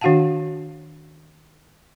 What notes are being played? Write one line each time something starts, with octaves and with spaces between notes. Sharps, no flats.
D#3 D4 F#4 F5 F#5 A5